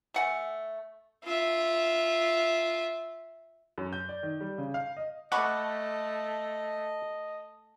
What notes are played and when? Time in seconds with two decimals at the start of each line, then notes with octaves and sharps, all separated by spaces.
0.14 A3 F#5 G#5
1.24 F4 E5
3.78 F#2
3.93 G6
4.09 D5
4.23 D#3
4.41 G3
4.58 C#3
4.74 F5
4.97 D#5
5.32 A3 D#5 F#5 B5 C#6 D6